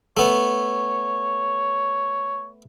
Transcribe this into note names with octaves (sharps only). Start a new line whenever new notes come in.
A3 B3 C#5